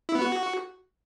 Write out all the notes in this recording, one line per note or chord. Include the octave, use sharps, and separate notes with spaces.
E4
B3
F#4